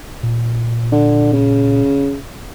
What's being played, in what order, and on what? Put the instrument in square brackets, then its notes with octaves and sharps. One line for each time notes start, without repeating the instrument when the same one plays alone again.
[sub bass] A#2
[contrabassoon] D3
C#3